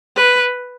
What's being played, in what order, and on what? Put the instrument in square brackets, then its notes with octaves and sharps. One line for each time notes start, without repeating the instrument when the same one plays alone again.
[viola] B4